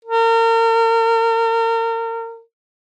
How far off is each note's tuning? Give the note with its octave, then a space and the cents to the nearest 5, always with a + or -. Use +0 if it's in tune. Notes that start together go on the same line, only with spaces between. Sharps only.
A#4 -35